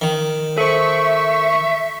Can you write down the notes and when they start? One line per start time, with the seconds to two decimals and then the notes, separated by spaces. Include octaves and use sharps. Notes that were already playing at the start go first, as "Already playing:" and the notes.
0.01 D#3
0.58 A4 C5 E5 C#6